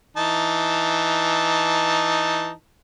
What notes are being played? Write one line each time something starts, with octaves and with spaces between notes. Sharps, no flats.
E3 D#4 A5